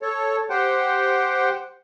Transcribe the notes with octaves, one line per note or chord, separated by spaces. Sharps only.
A4 C#5
G4 C5 F#5 G5